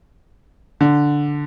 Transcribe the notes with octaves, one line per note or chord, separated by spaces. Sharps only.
D3